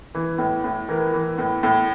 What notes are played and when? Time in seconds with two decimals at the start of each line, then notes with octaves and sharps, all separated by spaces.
0.15 E3
0.38 A2
0.64 A2
0.88 E3 A#4
1.13 E3
1.38 A2
1.63 A2